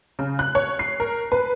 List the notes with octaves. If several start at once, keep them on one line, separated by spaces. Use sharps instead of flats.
C#3
F#6
C#5
C7
A#4
B4